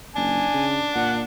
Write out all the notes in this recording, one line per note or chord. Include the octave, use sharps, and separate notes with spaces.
F#1 D4 G#5
C#3
A#2 F#5